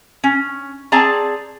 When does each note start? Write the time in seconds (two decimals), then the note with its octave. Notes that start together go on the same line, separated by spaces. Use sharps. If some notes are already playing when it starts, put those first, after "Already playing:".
0.24 C#4
0.92 C4 G#4 D5 A5 A#5